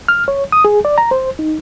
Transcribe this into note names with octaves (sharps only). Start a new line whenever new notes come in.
F6
C#5
D#6
G#4
D5
A#5
C5
D#4